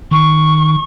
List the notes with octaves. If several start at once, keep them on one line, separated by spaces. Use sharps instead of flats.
D#3 C#6